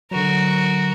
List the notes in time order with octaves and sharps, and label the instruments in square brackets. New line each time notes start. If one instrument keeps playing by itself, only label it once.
[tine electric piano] D3 F#3 [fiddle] F#4 A#4